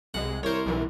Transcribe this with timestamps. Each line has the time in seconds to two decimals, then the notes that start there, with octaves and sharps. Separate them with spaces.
0.14 C2 G#3 F#5
0.43 C2 A#4 C5 C#5
0.66 B1 E3